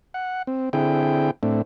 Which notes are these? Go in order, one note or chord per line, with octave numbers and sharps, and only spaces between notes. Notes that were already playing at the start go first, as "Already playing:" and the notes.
F#5
C4
D3 C4 E4 G#4 G5
A2 A3 C4 D4